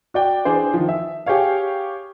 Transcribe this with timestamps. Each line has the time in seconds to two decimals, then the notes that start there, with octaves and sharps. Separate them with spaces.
0.14 F#4 D5 G5
0.45 E3 D4 G#4 C5
0.74 D#3 F3
0.89 E5
1.26 G4 G#4 C#5 F5